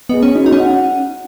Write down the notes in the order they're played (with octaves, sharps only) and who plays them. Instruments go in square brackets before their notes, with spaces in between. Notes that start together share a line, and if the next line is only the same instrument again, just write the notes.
[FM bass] B3 [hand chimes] G#4 D#5
[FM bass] C#4
[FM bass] D#4 [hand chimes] F#4
[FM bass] D#4
C#4
[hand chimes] F#5